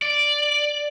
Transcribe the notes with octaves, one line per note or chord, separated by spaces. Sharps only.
D5